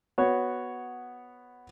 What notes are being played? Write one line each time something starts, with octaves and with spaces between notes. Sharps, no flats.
B3 F#4 C#5